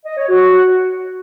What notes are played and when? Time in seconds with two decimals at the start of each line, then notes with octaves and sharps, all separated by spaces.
0.05 D#5
0.17 C#5
0.29 F#4